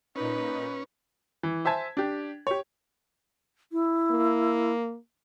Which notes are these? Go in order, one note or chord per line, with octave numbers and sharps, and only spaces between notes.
A#2 C#4 D#4 B4
E3
C5 E5 G#5 A5 G#6 B6
D4 G4
G4 C#5
E4
A#3